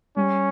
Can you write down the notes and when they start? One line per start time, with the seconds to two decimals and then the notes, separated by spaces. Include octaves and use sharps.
0.16 G3 C#4